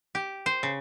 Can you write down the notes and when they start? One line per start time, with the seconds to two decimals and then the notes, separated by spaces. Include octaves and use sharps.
0.15 G4
0.46 C5
0.63 C#3